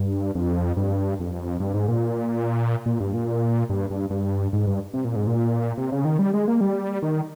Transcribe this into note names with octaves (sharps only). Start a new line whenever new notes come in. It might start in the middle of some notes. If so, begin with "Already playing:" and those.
Already playing: G2
F2
G2
F2
G2
G#2
A#2
A#2
G2
A#2
G2
G2
G2
G#2
G2
C3
A#2
G#2
A#2
C3
C#3
D#3
G3
G#3
A#3
G3
D#3